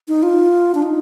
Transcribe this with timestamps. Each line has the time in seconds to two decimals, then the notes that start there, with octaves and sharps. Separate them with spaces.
0.08 D#4
0.23 F4
0.75 D4
0.82 D#4